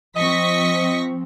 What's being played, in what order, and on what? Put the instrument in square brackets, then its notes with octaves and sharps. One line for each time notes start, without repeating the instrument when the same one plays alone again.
[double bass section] F3 C4 [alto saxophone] D#5 [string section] C#6 A#6 B6